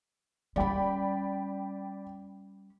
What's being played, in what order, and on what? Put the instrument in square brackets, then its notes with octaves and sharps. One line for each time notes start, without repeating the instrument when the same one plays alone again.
[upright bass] G3 C#4 [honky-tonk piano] D5 G5 B5